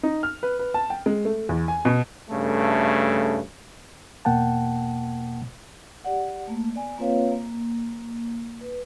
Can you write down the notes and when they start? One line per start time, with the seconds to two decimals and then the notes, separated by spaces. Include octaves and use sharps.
0.03 D#4
0.23 F6
0.43 B4
0.59 B4
0.74 A5
0.90 G5
1.06 G#3
1.25 A3
1.49 E2
1.68 G#5
1.85 B2
2.30 G2 C#3 A3
4.25 E2 B2 A#3 F#5 G5 A5
6.04 G4 D5 F#5
6.47 A3 A#3
6.74 B3 D5 G#5
6.98 A#3 C4 F4 B4 C#5 F5
7.32 A#3
8.61 B4